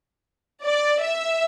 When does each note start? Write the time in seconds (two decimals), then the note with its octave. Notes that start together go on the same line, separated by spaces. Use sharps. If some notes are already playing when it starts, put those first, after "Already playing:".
0.64 D5
1.02 E5